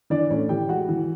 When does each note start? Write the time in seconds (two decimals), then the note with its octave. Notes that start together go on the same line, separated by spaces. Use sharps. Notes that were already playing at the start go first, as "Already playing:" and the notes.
0.10 E3 D4 D5
0.30 A2 C#4 C#5
0.49 E3 G4 G5
0.69 G#3 F#4 F#5
0.89 E3